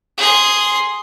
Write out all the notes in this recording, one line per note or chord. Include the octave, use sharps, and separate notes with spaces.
G#4 C6